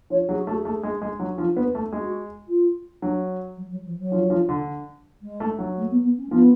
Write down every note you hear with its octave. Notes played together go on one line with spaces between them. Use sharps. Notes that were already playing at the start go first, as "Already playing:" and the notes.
F3 C#5
F#3 G#4
F#4
A3
G#4
A3
G#3
G#3
F#3
F3
B3
A3
G#3 F#4
F4
F#3 D4
F#3
F#3
F3
F#3
F3
F3
D3
G#3
A3
F#3
A3
B3
B3
C#4
A3
F3 B3